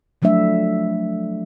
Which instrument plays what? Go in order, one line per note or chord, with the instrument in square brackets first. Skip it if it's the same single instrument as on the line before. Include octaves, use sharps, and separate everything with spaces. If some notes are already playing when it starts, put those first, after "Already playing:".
[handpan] F3 F#3 A3 D4 E5